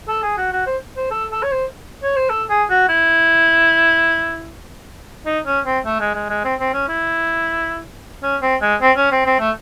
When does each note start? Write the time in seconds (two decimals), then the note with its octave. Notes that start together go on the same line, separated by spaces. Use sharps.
0.08 A4
0.23 G#4
0.37 F#4
0.52 F#4
0.66 C5
0.97 C5
1.11 A4
1.32 A4
1.43 C#5
1.51 C5
2.03 C#5
2.16 C5
2.30 A4
2.50 G#4
2.70 F#4
2.89 E4
5.26 D#4
5.46 C#4
5.65 C4
5.85 A3
6.00 G#3
6.15 G#3
6.30 G#3
6.44 C4
6.60 C4
6.74 C#4
6.88 E4
8.23 C#4
8.42 C4
8.62 G#3
8.81 C4
8.97 C#4
9.12 C4
9.26 C4
9.40 A3